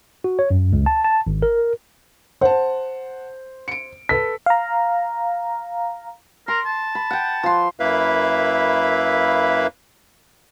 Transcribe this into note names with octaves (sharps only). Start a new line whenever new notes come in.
F#4
C#5
F#2
C#2
A5
A5
G#1
A#4
C5 F#5 A5
C#7 D7
A4 B4 B6
F5 A#5
A#4 C6
A5
B5
F#5 G5
F3 C6
F#2 A#3 E4 B4 E5 F5